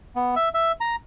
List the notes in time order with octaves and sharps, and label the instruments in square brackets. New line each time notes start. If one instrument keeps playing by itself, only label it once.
[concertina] B3
E5
E5
A#5